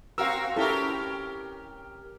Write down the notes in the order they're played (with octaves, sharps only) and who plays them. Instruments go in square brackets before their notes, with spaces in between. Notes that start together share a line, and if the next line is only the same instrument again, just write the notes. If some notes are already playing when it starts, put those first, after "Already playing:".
[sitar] C4 F#4 A#4 [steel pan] F5 E6
[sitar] C#4 G4 A#4 [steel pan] E4 A4